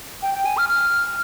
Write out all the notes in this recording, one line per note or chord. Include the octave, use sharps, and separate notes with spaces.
G5
G5
G#5
F6
F6